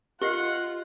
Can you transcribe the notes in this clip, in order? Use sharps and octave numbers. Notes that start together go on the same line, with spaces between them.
F4 G4 A#4 D#5 F#5 C7